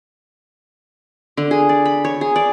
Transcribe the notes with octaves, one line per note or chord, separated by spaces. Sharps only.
D3
G#4
D5
B5
C#5
G#4
D5